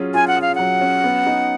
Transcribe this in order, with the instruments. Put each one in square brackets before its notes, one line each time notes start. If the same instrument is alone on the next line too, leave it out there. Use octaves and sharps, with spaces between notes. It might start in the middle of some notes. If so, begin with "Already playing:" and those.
Already playing: [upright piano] F#3 C#4 F4 G#4
[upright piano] F4 [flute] G#5
[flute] F#5
[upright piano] G#4
[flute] F5
[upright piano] F#3 [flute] F#5
[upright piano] C#4
B3
D#4